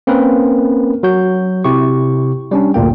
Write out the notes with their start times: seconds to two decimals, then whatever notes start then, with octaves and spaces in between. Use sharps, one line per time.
0.07 A#3 C4 C#4 A#4 B4
1.03 F#3 F#4 G6
1.64 C3 E4 G4 C#6
2.51 G3 C#4 D4
2.74 G1 D2 A#2 A#3 G5